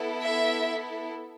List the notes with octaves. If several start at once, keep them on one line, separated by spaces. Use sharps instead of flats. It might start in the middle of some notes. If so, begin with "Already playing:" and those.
Already playing: B3 E4 A4
E5